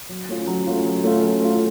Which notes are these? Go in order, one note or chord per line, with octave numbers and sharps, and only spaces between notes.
F#3
A3 C#4 F4
F#3
A3 C#4 F4
F#3
A3 C#4 F4
F#3
A3 C#4 F4